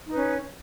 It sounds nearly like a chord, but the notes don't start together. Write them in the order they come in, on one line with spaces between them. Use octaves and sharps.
D#4 B4 C#4